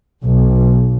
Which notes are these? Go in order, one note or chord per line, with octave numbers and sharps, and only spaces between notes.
B1